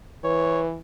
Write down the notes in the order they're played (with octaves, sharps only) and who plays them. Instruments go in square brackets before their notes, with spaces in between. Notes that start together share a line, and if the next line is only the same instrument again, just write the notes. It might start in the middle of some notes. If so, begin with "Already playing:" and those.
[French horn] E3 [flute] B4 [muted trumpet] C#5